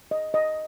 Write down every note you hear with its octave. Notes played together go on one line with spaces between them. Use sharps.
D#5
D#5